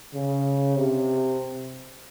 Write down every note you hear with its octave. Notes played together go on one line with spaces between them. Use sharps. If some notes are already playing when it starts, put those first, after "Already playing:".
C#3
C3